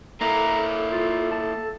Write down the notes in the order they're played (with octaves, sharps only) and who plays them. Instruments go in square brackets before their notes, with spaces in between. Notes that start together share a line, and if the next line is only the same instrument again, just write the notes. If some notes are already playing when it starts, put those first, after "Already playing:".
[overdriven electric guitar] A#3 E4 [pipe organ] A4 [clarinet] A#5
[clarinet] F4
A5